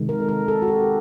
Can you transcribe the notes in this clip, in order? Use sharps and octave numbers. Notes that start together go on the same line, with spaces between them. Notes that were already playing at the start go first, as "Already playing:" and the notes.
Already playing: C3 D#3 G#3
A#4
A4
A#4
A4
F#4
G4